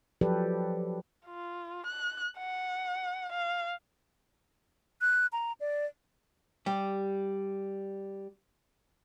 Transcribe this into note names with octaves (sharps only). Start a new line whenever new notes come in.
F3 F#3 G4 A4 B4 D5
F4
F#6
F#5
F5
F#6
A#5
D5
G3 G4